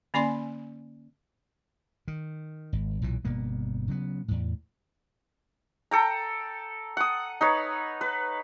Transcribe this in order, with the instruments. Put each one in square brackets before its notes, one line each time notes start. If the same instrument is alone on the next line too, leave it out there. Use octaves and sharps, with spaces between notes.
[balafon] D3 A#3 C#4 D5 G#5 C6
[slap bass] D#3
G#1
B1 A#2 E3
G1 B2 A#3 B3
C#3 F#3 G#3 B3
E2 A2
[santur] A4 G5 A#5
F#5 D#6
D#4 B4 C#5
B4